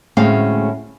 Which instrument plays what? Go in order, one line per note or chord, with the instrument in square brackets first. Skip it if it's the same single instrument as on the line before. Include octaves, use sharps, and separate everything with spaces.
[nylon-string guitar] D2 A2 G#3 C4 C#4 F5